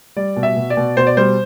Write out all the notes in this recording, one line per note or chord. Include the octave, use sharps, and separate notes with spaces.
G3 D5
B2
E5
B2
D5
B2
B2 C5
D5
G3 C5